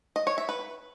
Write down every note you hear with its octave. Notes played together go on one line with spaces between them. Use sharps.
D#5
C#5
E5
B4